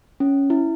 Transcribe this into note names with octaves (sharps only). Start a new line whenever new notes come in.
C#4
E4